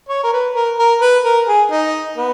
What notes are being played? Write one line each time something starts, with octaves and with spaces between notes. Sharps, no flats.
C#5
A#4
B4
A#4
A#4
B4
A#4
G#4
D#4
B3